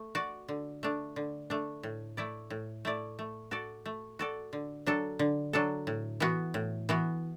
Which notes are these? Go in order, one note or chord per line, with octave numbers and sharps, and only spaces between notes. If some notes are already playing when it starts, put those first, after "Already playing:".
Already playing: A3
F#4 D5
D3
A3 D4
D3
A3 D4
A2
A3 E4 D5
A2
A3 E4 D5
A3
F#4 A4 D5
A3
F#4 A4 D5
D3
F#3 D4 A4
D3
F#3 D4 A4
A2
E3 B3 F#4
A2
E3 B3 F#4